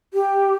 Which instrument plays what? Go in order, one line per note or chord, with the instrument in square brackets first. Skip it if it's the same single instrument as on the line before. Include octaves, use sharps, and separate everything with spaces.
[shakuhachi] G4